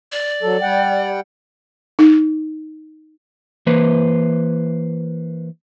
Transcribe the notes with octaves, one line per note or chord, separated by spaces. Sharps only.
D5
F#3 A4
G3 F#5 G5
D#4
E3 A#3 B4 C5